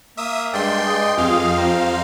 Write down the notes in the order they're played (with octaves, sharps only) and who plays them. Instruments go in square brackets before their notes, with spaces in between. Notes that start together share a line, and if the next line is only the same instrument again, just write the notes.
[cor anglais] A#3 [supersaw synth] E5 D#6
[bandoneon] G2 D5 [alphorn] G#3 [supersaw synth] G5 C6
[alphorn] G#3 [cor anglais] D#5
[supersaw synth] F2 F5 [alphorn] F4 [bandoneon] G4 G#4
[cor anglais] C5 [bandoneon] G5 A#5